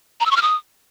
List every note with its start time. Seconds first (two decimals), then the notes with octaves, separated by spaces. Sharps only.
0.20 A#5
0.26 E6
0.31 C#6
0.37 F6
0.42 D#6